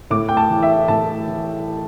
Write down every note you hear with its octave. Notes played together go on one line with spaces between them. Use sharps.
A2 D6
G5
A5
E3
E5
A2 A5
E3